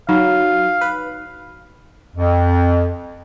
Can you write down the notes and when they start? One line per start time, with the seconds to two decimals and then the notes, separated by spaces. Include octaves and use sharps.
0.09 F#3 D#4 F5
0.81 B4
2.15 F2